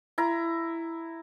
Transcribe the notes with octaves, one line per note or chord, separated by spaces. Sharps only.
E4 A#5